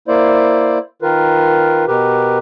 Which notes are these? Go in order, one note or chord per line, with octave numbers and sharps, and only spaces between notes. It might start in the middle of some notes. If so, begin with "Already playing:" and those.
A#3 E4 C5 D5
D#3 F4 A#4 B4
B2 G4 A#4 B4